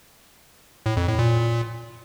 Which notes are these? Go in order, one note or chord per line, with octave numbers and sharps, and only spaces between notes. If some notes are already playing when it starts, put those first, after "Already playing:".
A2
F2
A2
A#2